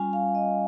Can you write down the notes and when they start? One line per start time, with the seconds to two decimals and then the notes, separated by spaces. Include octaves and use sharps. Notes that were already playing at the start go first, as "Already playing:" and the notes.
Already playing: G3 C#4 F4 G#5
0.13 F5
0.35 D#5